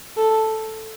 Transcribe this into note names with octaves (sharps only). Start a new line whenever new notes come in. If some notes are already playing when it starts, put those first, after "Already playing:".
A4